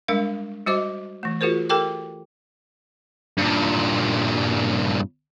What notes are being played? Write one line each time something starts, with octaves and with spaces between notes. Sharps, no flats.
G3 G#3 D4 A#4 F5
G3 F#4 C5 D#5 D6
E3 A3
F4 F#4 G#4 A#4 C5
G4 A4 A#4 G5 D6
G2 A#2